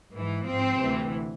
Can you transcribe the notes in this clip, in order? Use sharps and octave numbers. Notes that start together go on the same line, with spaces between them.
G#2 E3
G#2 F3 C4
D2 C3 E3